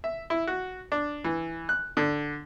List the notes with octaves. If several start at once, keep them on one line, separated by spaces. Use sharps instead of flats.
E5
E4
F#4
D4
E3
F#6
D3